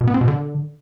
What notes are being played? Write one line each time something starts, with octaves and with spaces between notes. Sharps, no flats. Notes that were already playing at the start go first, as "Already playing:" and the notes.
B2
B3
C4
B2
D3